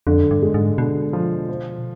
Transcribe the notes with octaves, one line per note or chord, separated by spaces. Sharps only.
F2 D3
G2
G#3
G#2
B2 D3
F3
C5